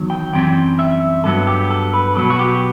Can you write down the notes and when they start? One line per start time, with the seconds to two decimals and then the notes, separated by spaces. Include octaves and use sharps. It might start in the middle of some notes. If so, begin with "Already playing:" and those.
Already playing: E2 D#3 F#3
0.10 G5
0.33 F#2 E3 G3 C4 G5
0.79 E5
1.24 G2 F#3 B3 A4
1.47 G4
1.70 A4
1.93 B4
2.15 B2 F#3 B3 A4
2.30 F#4
2.39 G4